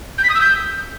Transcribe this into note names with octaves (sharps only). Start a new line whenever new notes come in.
G6
B6
D#6
E6
G6